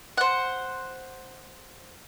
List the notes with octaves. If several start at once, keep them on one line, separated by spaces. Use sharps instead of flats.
C5 F#5